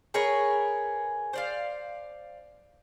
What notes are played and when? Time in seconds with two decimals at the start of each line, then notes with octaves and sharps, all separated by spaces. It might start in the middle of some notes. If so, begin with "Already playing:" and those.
0.14 G#4 A#4 B4 C#5
1.33 C5 D5 F5